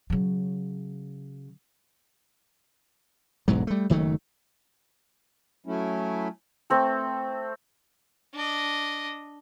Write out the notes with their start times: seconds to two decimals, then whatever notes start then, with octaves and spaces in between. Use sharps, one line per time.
0.10 C#3 F#3
3.48 E1 B1 G#2 F#3
3.67 G3 A3
3.90 F#1 D#3 F#3 A3
5.66 F#3 A3 C#4 E4
6.70 A3 C4 A4
8.34 D4 D#5